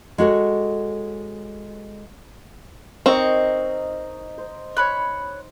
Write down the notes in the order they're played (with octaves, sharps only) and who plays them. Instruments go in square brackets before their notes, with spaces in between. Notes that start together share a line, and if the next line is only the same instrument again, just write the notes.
[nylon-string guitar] G#3 F#4 A4 C#5
[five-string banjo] C4 [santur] D#4 D#5 [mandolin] A#4 C#6
[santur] C5
[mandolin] C#5 B5 F#6